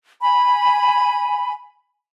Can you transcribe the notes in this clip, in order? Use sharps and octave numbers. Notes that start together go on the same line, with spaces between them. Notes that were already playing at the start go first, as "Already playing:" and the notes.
G#5 B5